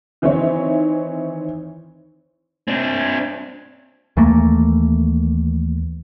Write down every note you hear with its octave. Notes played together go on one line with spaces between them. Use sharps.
D#3 E3 C4 D#4 E4 C#5
C4 D4
D#2 E3 A3 A#3